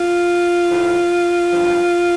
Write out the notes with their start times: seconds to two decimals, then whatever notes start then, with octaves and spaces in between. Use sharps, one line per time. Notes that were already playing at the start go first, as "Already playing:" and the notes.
Already playing: F4
0.69 A2 F3
1.51 G2 F3